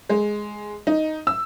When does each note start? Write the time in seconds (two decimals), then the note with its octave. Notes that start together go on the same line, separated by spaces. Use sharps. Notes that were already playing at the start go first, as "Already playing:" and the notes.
0.09 G#3
0.87 D#4
1.27 E6